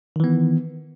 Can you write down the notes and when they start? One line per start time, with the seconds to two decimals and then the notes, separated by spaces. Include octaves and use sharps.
0.16 D#3
0.20 E3
0.24 B3